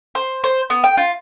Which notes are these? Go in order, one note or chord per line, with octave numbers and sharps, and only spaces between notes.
C5
C5
B3
G5
F4